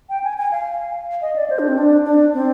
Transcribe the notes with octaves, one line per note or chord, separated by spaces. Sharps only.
G5
G#5
G#5
F5
D#5
D5
C5
D4
C4
D4
D4
C4